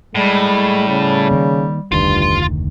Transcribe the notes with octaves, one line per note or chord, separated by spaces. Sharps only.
A2 G3 G#3
C#3
D#3 A#3
F1 D2 G2 D#3 F4 C6